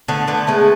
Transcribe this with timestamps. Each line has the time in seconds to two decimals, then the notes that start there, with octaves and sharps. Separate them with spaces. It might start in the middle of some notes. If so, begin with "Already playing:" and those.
0.08 D3 A3 B3
0.28 D3 A3 B3
0.47 G#3 A3 B3